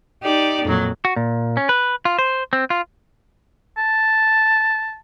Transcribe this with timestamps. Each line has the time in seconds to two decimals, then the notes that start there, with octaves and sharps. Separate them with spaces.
0.21 D#4 G4 D5
0.64 F2 A#2 F#3
1.05 F#4
1.16 A#2
1.57 C#4
1.69 B4
2.05 F4
2.19 C5
2.53 C4
2.70 F4
3.78 A5